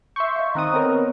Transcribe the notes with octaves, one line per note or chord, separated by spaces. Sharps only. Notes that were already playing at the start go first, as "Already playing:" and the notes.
E5 C6 C#6 G6
D#5 F5
D#3 C4 A#5 D#6 F#6
B3 C4 A#4 B4 C#5